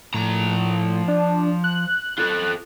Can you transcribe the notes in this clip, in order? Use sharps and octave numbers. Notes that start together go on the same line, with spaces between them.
A2 F3 A#5
D4
F#6
F4 A4